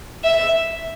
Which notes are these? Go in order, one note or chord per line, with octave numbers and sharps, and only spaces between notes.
E5